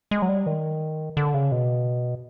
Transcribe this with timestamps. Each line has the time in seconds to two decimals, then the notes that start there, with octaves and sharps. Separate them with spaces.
0.11 G#3
0.22 F#3
0.29 G3
0.46 D#3
1.17 D3
1.34 C#3
1.52 B2